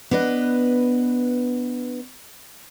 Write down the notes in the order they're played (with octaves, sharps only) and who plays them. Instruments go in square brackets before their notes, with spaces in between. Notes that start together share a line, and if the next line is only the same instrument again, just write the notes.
[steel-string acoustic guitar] B3 D4 B4 D#5